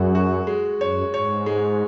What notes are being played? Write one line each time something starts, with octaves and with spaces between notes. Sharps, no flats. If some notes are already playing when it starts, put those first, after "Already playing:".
Already playing: F#2 G#3 F#4
F#4
G#3
F#2 C#5
G#2 C#5
G#3